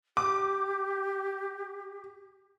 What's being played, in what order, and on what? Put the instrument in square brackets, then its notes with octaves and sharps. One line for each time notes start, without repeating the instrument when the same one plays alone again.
[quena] G4 [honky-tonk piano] D6